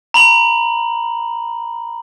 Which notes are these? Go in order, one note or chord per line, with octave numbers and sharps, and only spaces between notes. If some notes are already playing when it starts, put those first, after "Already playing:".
A#5 B5 F#7